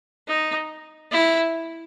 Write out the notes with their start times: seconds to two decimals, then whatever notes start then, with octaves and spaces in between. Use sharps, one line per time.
0.28 D#4
1.12 E4